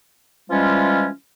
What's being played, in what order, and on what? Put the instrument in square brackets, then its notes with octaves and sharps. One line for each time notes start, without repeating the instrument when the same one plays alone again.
[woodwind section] E3 F3 G3 G#3 C#4 F4